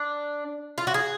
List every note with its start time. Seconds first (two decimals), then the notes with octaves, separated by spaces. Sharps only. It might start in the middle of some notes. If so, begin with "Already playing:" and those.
Already playing: D4
0.78 F4
0.87 F#4
0.94 G#4